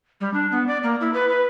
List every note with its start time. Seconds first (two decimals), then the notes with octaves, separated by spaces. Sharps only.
0.21 G3
0.34 D4
0.52 B3
0.67 D5
0.83 A#3
1.01 E4
1.14 B4
1.29 B4